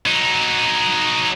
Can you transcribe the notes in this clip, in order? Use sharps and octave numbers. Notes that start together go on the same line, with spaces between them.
F#3 D#4